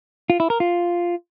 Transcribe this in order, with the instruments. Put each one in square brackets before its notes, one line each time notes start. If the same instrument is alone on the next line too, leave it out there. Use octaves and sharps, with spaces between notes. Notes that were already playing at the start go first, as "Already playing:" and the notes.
[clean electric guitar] F4
E4
A#4
F4